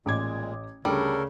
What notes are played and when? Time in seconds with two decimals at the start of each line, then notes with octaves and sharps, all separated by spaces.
0.06 A1 A#2 G#3 D6 G#6
0.85 D2 C#3 G3 A4 A#4